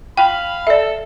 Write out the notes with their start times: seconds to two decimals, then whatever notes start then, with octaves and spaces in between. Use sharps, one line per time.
0.17 F5 G5 B5
0.67 A4 D5 E5